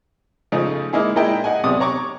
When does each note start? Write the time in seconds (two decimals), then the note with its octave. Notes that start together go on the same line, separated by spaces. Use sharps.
0.52 C#3 F3 A3 D#4 G#4
0.93 G#3 A#3 D#4 E4 G#4
1.16 A#2 G#3 E4 A#4 D#5 G5
1.44 G#4 D#5 F#5 G#5
1.63 B1 C3 D5 D#6
1.80 C#5 A#5 C#6 D6